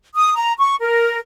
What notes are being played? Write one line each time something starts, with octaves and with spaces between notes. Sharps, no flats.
D#6
A#5
C#6
A#4